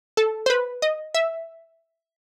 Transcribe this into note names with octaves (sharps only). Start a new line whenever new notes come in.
A4
C5
B4
D#5
E5